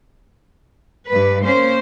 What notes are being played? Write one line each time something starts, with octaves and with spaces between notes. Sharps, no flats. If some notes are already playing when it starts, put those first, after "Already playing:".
G2 B4
A#3 C#4 C5